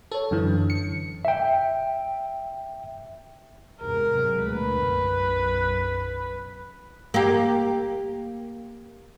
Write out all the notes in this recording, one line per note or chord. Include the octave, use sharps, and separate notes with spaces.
A4 C#5
F#2 D3 E3
C#7
E5 G5
E2 G#2 C3 A#4
C3 F#3 G#3
D2 B2 B4
B1 F#2
A#3 G4